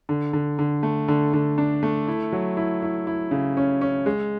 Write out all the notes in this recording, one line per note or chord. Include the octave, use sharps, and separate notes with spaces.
D3
D3
D3
A3
D3
D3
D4
A3
E4
F#3
E4
E4
E4
C#3
C#4
C#4
G#3